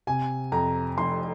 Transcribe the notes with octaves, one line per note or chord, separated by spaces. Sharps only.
C3 G#5
F2 A#5
F1 C6